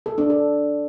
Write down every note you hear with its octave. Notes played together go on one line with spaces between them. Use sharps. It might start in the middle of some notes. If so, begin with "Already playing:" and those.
A4
D4
A4